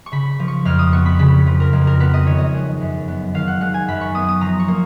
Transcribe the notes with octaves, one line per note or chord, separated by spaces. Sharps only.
C#6
C#3 B5
F3
C#6
F2 F6
D#6
B3 C#6
B5
C#3 B5
F3
A#4
F2
A#4
B3 B4
D#5
D#3 C#5
D#5
G#3
F#2
B3
D#3 F5
F#5
G#3 F#5
G#5
F#2 B5
C#6
B3 D#6
D#6
F3 A#5
C#6
A#3